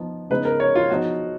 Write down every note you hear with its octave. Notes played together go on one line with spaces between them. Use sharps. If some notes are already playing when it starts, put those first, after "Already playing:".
Already playing: F3 B3 D#4
C#3 G#3 B3 D#4 B4
A#4
C#5
F4
F3 B3 D#4 F#4